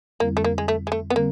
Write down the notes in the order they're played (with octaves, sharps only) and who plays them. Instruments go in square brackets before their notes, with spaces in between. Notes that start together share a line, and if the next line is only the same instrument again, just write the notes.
[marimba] F2 D3 G3 C4 E4 [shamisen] A#3
[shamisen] A3
A#3
G#3
A3
G#3
A3
B3
[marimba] D3 G3 C4 [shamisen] A#3